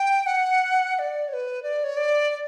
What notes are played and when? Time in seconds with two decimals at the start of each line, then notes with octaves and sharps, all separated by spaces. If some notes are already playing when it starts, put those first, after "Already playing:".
Already playing: G5
0.26 F#5
0.95 F#5
0.99 D5
1.28 C#5
1.33 B4
1.63 D5
1.84 C#5
1.97 D5
2.30 D5